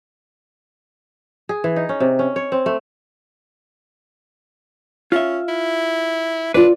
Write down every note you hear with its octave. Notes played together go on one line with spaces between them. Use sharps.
G#4
E3
D#4
C#4
C3
C#4
C#5
C4
A3
C#4 F4 E5
E4
D4 F4 B4 D5